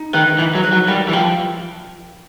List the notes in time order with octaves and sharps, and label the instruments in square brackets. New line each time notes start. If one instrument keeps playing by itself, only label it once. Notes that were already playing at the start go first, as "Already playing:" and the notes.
Already playing: [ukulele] D#4
[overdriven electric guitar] D#3 [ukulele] B4
[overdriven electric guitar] E3 [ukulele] D#4
[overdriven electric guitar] F#3
[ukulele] B4
[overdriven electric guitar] F#3
[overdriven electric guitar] G3 [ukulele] A#4
[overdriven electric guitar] E3
[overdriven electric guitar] F3 [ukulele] G5